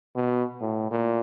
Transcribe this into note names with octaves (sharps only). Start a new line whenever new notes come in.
B2
A2
A#2